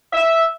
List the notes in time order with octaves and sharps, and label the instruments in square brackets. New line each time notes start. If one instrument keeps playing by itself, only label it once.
[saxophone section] E5